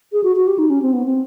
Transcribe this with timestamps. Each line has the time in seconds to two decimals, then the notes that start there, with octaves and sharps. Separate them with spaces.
0.12 G#4
0.24 F#4
0.36 F#4
0.47 G4
0.58 D#4
0.70 C#4
0.82 C4
0.93 B3
1.05 C4